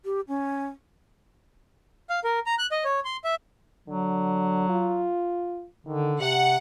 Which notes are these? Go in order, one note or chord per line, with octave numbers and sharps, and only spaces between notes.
G4
C#4
F5
A#4
A#5
F#6
D#5
C#5
C6
E5
D3 F#3
F4
D3 D#3
C3 G4 F#5